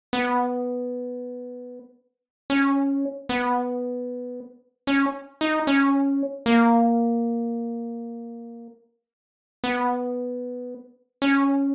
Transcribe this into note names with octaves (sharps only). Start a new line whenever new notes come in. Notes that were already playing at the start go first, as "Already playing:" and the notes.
B3
C#4
B3
C#4
D#4
C#4
A#3
B3
C#4